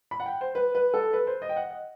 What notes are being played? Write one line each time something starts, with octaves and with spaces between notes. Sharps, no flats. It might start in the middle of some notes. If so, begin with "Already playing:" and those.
B5
F#5
G5
C5
B4
B4
A4
B4
C5
D#5
G5
F#5
D#5